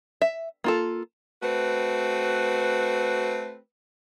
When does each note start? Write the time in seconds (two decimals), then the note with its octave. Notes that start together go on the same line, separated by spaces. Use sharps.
0.22 E5
0.64 A#3 F4 A4
1.42 A3 C4 F#4 B4